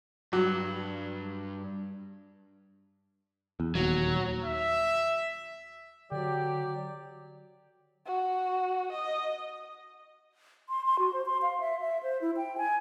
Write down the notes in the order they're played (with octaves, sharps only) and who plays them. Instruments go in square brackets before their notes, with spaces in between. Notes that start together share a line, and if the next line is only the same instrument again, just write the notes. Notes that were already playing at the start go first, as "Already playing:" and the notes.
[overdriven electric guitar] G2 [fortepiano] F#3
[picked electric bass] E2
[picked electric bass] D#1 D#2 [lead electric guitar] F#3
[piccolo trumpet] E5
[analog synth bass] D3 [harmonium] F#3 D5 [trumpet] G4
[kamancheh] F#4
D#5
[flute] C6
C6
F#4
C5
C6
F5
E5
E5
C5
E4
G5
G#5